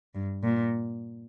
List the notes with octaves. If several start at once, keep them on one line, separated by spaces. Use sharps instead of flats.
G2
A#2